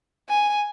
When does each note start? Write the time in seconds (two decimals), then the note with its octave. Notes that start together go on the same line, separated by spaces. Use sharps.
0.29 G#5